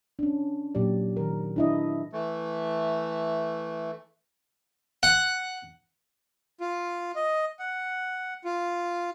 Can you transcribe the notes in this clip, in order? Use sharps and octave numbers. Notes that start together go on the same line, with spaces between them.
C#4 D4
A#2 F#3 G4 D5
D#3 A#4
D4 E4 D#5
E3 A3
F#5
F4
D#5
F#5
F4